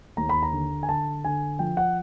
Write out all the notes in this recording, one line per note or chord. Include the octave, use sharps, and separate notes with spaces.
D#2 A#5
B5
A#5
D3
G#5
D3 A5
D3 G#5
F3 G5
F#5